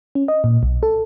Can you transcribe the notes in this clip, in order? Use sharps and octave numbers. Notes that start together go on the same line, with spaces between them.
C#4
D#5
A#2
B1
A4